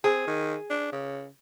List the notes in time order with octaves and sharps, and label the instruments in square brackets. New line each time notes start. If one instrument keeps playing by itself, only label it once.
[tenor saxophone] C4 [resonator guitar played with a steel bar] G#4
[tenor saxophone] D#3
D4
C#3